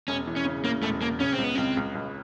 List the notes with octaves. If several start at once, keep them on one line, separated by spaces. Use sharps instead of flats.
E1 C#4
E3
C#4
C#3
C#3 A#3
E1 A3
E1 A#3
C#3 C#4
C4
C#2
B3
C#2 C4
C#2
C#2